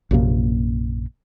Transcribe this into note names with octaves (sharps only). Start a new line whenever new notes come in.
A#1 F#2 C3 A#3